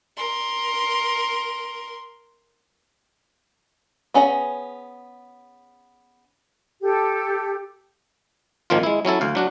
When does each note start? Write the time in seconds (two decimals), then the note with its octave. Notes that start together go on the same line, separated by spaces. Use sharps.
0.17 A#4 C6
4.14 B3 C#4 G#4 F5 A#5
6.82 G4 A4
8.70 G#1 D#3 F3 A#3 F4
8.83 G#3 E4
9.05 F#3 C#4 E4 A4
9.21 D2 F5
9.35 F#3 D4 F#4